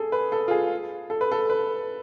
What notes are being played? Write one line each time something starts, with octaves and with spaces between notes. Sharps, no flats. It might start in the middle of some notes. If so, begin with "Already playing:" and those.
Already playing: G#4 A4
B4
A4
F4
G#4
A4
B4
A4
B4